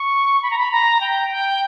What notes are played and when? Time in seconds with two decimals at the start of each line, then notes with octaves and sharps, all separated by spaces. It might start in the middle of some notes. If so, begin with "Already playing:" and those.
Already playing: C#6
0.43 B5
0.50 A#5
0.58 B5
0.71 A#5
1.01 G5
1.30 G5